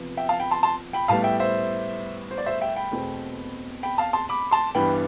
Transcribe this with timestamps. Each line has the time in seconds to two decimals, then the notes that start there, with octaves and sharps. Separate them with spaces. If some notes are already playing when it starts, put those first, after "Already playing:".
Already playing: C3 F3 B3
0.17 E5 G5
0.29 F5 A5
0.40 G5 B5
0.51 A5 C6
0.63 A5 C6
0.93 G5 B5
1.08 A2 G3 B3 F5 A5
1.24 E5 G5
1.40 C5 E5
2.31 C5
2.38 D5
2.46 C5 E5
2.61 E5 G5
2.76 G5 B5
2.92 E2 B2 A3 C4
3.83 G5 B5
3.98 F5 A5
4.13 A5 C6
4.29 B5 D6
4.51 A5 C6
4.75 G2 E3 G3 B3 G5 B5